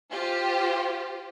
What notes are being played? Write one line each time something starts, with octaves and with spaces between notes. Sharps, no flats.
F4 G4 C5